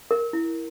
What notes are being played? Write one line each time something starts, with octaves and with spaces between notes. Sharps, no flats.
A#4
E4